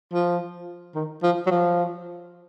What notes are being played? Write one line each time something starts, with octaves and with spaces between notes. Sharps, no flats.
F3
D#3
F3
F#3
F3